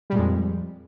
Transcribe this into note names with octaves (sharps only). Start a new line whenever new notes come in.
F2 A#2 G3 G#3